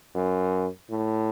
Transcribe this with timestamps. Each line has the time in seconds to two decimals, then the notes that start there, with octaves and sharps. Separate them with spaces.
0.15 F#2
0.90 A2